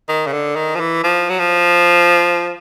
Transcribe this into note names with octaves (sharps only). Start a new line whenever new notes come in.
D#3
C#3
D3
D#3
F3
E3
F3
F#3
F3